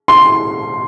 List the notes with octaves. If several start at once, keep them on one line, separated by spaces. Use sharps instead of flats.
C6